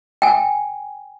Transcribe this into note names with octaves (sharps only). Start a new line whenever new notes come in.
G5 G#5